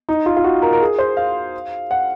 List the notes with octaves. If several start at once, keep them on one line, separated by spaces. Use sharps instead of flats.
D#4
F4
F4
F#4
A#4
A#4
G#4
C5
F5
F#5